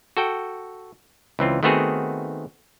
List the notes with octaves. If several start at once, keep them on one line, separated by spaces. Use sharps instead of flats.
F#4 A4 G5
C#2 E3 C4 F4
D#3 A3 B3 C4 F#4 G#4